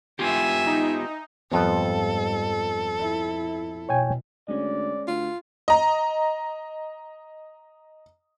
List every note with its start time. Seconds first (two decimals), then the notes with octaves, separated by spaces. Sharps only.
0.19 B3 F4 G4 E5 G#5
0.67 D#4
1.52 F2 G#2 F3 G3 B3 A4
2.99 E4
3.89 B2 C#5 G5 G#5
4.48 D2 G#3 C#4 D5
5.08 D2 F4
5.68 D#5 A#5